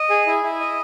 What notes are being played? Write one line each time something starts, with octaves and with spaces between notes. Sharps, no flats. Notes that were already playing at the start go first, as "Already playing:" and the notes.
Already playing: D#5
G#4
E4
E4
D#5